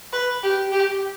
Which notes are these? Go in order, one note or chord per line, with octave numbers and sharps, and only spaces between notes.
B4
G4
G4